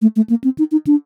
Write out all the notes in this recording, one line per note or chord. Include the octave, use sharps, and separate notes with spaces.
A3
A3
A#3
C4
D#4
D#4
D4